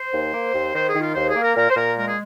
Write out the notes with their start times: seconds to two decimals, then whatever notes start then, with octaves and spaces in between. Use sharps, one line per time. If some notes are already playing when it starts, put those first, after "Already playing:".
Already playing: C5
0.12 D#2
0.33 A#3
0.53 D#2
0.74 D#3 C5
0.87 G#4
0.94 D#3
1.01 F4
1.15 D#2 C5
1.28 G#4
1.35 A#3
1.42 A#4
1.56 A#2 A#4
1.70 C5
1.76 A#2 A#4
1.96 G#3 A#4
2.07 G#4